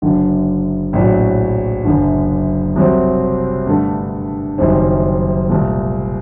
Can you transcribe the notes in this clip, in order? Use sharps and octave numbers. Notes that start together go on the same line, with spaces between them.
F#1 F#2 D3
A#1 A2 F#3
F#1 F#2 D3
C2 C3 F#3 C4
G2 D3 A3
F#1 F#2 D#3 G3 C4
C2 A#2 A3